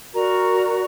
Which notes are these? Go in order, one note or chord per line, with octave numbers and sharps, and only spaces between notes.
F#4 A#4 D5 A#5